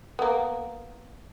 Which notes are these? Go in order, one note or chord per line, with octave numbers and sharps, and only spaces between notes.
A#3 B3